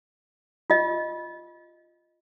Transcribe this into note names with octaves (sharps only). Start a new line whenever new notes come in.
F4 D#5